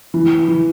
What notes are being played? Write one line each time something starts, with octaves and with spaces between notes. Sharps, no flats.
E3
E3